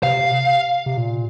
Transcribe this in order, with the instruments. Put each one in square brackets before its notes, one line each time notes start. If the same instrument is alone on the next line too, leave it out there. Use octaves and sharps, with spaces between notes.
[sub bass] C3 [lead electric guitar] F5
[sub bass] C3
A#2